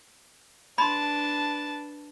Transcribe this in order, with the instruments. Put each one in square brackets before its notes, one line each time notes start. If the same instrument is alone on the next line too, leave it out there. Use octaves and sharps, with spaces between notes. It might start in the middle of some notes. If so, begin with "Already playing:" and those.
[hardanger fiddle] D4 B4 [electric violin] A5 [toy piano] B5 C6